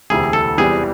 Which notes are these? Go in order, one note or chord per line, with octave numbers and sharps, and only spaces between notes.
E1 D2 C3 E3 G#4
A4
E2 C3 E3 G3 B3 G#4